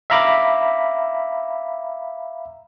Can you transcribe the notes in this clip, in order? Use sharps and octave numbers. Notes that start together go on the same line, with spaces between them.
E5 F5 A#5 B5 D6